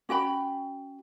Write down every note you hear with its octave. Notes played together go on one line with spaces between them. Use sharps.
C#4 F#4 G5 B5